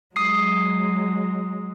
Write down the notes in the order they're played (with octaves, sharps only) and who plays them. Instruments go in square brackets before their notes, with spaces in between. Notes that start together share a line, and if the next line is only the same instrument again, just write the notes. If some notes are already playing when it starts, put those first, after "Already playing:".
[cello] F#3 G#3 [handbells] D#6 C7